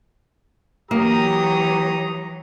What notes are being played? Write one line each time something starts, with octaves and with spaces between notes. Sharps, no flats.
E3 F#3 A#3 G4 A#5 D#6